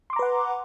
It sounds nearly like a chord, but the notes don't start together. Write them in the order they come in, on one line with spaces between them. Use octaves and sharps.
C6 D6 A#5 B4 F#5